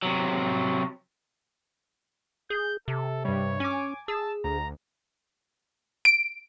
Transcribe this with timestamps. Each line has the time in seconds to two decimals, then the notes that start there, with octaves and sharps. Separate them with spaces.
0.03 C3 F#3
2.50 G#4 G6
2.88 C3 A4
3.25 G2 G3 C#5
3.60 C#4 G#5 D6
4.08 G#4 A5 E6
4.44 D2 A#5
6.05 D7